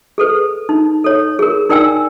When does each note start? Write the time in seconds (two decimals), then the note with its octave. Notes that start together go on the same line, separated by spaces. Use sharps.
0.18 G#4 A4 B4
0.69 D#4
1.04 A4 C#5
1.39 G#4 A#4
1.70 D#4 A#4 D5 G5 G#5 E6